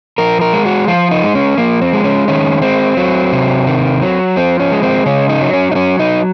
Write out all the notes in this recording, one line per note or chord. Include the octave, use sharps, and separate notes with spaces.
F3 A#4
A#4
G#3
F#4
F3 F4
D#4
G#3
C#4
F3 A#3
C4
G#3
C#4
D#3 C#4
G#3 C4
F#3
C3
D#3
F#3
F3 C4
C#4
G#3
C4
C#3 C#4
D#4
F#3
C#4
D#4
F#3 C#4
D#4